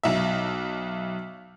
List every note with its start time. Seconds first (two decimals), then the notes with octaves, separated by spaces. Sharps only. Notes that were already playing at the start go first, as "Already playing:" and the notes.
0.03 B1 E5